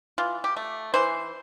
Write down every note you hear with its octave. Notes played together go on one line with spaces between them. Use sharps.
E3 F4
G4
A3
E3 C5